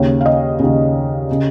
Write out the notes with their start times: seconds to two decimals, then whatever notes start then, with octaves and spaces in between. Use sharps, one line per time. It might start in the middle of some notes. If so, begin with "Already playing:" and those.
Already playing: D#2 C#3 C#5
0.21 F5
0.26 D#5
0.59 D#2 C#3
1.31 C#3